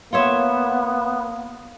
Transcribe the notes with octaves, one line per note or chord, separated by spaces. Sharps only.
A#3 B3 F4 C#5 E5